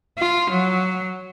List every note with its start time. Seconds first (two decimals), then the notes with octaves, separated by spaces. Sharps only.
0.19 F4
0.51 F#3